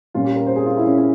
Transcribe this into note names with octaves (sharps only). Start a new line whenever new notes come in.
A#2 G3 C#4 F4
G4
A#4
C5
G#4
F4
E4
C#4
C#4